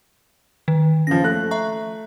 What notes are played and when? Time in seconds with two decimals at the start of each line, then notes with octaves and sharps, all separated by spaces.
0.68 D#3
1.07 C#3 F3 A#6
1.24 A3 F#6
1.51 E5 A#5 C#6